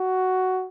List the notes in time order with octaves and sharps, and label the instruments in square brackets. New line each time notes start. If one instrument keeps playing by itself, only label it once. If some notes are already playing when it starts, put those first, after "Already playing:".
Already playing: [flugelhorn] F#4